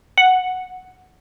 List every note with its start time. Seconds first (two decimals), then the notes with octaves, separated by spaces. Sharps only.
0.18 F#5